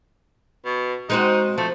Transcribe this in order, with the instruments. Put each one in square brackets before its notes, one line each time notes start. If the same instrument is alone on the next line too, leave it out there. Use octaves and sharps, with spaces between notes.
[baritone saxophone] B2
[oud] G#3 C4 F#4 [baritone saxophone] D#4
[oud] F3 [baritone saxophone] A3